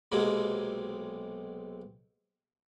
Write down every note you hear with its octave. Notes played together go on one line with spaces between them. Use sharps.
B1 C3 F#3 G#3 A#3